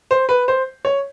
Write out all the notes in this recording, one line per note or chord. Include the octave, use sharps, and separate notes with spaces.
C5
B4
C5
C#5